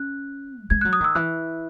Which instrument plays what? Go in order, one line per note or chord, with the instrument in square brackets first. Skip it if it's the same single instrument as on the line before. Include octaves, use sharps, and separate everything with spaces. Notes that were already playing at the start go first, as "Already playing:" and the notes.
Already playing: [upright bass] C#4 [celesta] F#6
[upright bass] F#3
[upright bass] G#3 [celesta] G#6
[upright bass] F#3 [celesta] F#6
[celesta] D#6
[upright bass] D#3 [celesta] E6
[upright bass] E3 [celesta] F#6